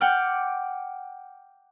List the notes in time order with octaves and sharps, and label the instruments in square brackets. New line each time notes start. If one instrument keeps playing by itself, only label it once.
[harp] F#5 G5 D6 F6